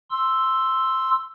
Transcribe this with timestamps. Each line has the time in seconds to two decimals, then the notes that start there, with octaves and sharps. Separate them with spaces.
0.10 C6 E6